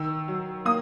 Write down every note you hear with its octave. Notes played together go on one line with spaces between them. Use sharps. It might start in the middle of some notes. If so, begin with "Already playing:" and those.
Already playing: D#3 E6
F#3
A#3 D#6